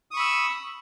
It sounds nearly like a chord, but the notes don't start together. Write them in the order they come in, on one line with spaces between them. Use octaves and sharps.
D#6 C#6 B5 E6